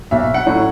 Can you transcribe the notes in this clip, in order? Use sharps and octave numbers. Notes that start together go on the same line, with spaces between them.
B1 E5
F#5
A2 F#3 C#4